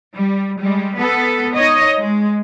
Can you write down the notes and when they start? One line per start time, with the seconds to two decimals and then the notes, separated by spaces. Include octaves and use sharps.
0.14 G3
0.59 G3 G#3
0.96 B3 A4
1.55 D#4 C#5 D#5
1.98 G#3